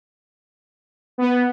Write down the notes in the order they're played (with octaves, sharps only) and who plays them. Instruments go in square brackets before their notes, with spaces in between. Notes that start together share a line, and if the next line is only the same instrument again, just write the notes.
[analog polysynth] B3